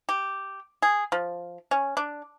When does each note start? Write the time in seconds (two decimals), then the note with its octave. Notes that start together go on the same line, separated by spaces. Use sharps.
0.09 G4
0.82 G#4
1.12 F3
1.71 C#4
1.97 D4